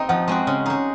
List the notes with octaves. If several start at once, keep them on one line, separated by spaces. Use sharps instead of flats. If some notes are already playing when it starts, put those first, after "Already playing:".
Already playing: C4 D#4 D#5
F3 F#5
G#3 C4 F#4
C#3
G#3 D#4